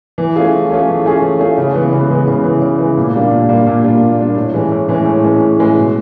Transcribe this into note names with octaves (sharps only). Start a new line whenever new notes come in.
E3
A3 C#4 F4 G#4
E3
A3 C#4 F4 G#4
E3
A3 C#4 F4 G#4
E3
A3 C#4 F4 G#4
C#3
E3 G#3 B3
C#3
E3 G#3 B3
C#3
E3 G#3 B3
C#3
E3 G#3 B3
A#2
G3 A#3 D4 F4
A#2
G3 A#3 D4 F4
A#2
G3 A#3 D4 F4
A#2
G3 A#3 D4 F4
A2
E3 G#3 C#4
A2
E3 G#3 C#4
A2
E3 G#3 C#4
A2
E3 G#3 C#4
B2